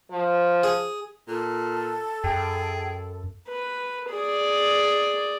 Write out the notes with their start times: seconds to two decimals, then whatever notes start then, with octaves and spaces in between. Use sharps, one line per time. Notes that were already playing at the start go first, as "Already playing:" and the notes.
0.11 F3
0.63 G#4
1.28 A#2 A4
2.24 F#2 G#4 G5
3.49 B4
4.10 G#4 D5